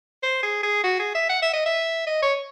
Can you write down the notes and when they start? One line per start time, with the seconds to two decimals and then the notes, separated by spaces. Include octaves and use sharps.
0.23 C5
0.43 G#4
0.63 G#4
0.84 F#4
1.00 G#4
1.15 E5
1.29 F#5
1.42 E5
1.53 D#5
1.66 E5
2.07 D#5
2.22 C#5